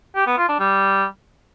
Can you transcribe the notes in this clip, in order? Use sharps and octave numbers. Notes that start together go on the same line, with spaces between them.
G4
B3
F4
D4
G3